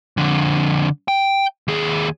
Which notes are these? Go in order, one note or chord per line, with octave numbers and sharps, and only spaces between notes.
F2 D3
G5
D#2 G#4